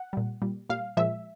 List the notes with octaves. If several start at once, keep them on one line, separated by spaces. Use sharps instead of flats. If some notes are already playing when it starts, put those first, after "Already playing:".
Already playing: F#5
A#2 G3
A#2 G3
A#2 G3 F5
A#2 F3 G#3 E5